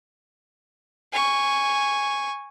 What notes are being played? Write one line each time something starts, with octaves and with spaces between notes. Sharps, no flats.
G#5 C#6